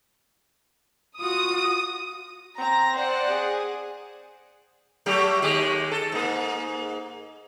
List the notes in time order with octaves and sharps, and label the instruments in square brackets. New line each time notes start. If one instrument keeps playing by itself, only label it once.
[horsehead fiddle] F4 F#4 [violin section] D#6
[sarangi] C4 [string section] A#5 A#6
[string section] C5 D5 F#5
[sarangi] G#4
[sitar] F#3 A3 G4
D#2 G#3 G4
A4
G#2 A#3